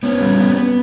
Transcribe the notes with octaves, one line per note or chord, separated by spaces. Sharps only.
B3 C#4
G3
B3
B3